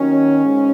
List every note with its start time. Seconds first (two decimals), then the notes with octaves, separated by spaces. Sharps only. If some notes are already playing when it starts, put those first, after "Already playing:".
Already playing: D#2 D#3 F#3 C#4
0.42 G#2